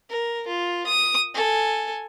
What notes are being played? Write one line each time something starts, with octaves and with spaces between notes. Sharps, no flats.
A#4
F4
D#6
A4 G#5